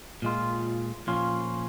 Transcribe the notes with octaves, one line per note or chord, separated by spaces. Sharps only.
A#2 G#3 F4
A#2 F3 C#4 F4